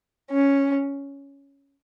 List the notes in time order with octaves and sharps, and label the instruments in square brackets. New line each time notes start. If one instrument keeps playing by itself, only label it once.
[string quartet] C#4